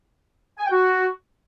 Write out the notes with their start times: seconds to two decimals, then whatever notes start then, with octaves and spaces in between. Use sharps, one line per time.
0.58 G#5
0.65 G5
0.71 F#4